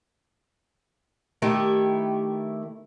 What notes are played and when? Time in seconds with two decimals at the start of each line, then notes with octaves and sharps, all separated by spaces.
1.42 D#3 A3 E4 G4